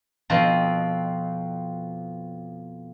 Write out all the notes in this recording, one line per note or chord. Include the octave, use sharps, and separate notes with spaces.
F2 B2 F3 C4 D#5